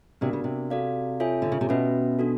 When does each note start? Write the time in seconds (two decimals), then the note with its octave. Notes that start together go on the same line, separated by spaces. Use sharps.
0.21 C3 B3 D4 F#4 A#4 D5
0.33 C#3
0.44 C3
0.70 F#4 A4 D5 F5
1.20 F4 A4 C#5 E5 G#5
1.42 D3
1.52 C#3
1.61 C3
1.69 B2 C#4 F#4 B4 E5
2.19 D4 F#4 A4